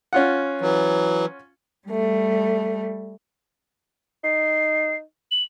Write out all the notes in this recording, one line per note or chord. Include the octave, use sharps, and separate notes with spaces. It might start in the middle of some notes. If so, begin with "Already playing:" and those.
C#4 F4 F#5
E3 F#3
G3 A3
D#4 C7
F#7